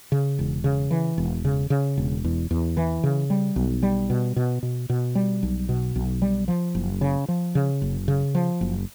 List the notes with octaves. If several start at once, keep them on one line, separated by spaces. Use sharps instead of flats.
C#3
E1
C#3
E3
E1
C#3
C#3
E1
E2
E2
E3
C#3
G3
B1
G3
B2
B2
B2
B2
G3
B1
B2
B1
G3
F3
F#1
C#3
F3
C#3
F#1
C#3
F3
F#1